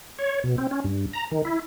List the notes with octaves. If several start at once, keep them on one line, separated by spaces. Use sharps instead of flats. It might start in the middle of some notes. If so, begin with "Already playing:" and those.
C#5
B2
C4
C#4
G2
A#5
D#3
E4